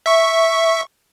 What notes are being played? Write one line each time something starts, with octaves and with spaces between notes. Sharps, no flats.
E5 C#6